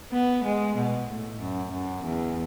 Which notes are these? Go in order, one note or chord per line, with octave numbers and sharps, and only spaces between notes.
B3
G#3
B2
A2
F#2
F#2
E2